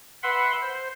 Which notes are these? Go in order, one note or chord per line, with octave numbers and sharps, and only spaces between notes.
B4 E5 F#5 B5 C6
C5